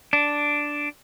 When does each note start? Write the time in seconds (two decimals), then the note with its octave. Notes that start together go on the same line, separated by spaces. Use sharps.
0.13 D4